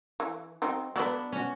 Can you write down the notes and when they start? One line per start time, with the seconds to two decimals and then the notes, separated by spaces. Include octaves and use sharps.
0.20 E3
0.62 F#3 C4 D#4
0.96 F#3 B3 D4 B4
1.33 C#4 F#4